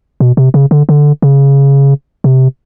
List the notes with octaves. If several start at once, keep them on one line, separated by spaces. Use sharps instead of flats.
B2
C3
C#3
D3
D3
C#3
C3